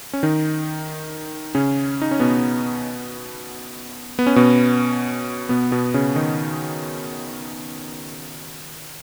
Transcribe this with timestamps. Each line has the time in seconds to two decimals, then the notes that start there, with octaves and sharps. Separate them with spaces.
0.13 C#4
0.23 D#3 D#4
1.55 C#3 C#4
2.02 D#4
2.11 C#4
2.20 B2 B3
4.19 B3
4.27 C#4
4.36 B2 B3
5.49 B2 B3
5.72 B2 B3
5.94 C#3 C#4
6.15 D#3 D#4